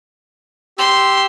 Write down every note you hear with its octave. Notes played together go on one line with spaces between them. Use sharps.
G4 C6 E6